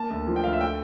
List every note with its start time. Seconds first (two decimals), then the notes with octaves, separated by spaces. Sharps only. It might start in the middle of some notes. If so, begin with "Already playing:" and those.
Already playing: A#3 A5
0.10 D2
0.27 F3
0.36 G5
0.44 D2 F5
0.53 E5
0.61 A3 G5